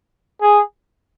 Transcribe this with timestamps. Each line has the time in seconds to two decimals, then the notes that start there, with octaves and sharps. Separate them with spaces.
0.42 G#4